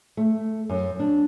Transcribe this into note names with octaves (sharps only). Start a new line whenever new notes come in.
A3
F#2
D4